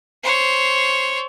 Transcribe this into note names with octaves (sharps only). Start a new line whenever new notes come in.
C5 C#5